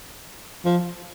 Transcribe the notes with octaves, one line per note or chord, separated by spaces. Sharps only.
F3